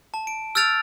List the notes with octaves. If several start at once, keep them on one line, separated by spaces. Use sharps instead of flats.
A5
D7
E6 F6 G6 A6 D7 F7